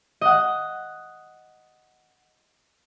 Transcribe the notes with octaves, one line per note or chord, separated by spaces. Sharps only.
D#5 F#5